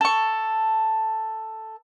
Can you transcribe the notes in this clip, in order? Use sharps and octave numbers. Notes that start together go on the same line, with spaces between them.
A4 C#6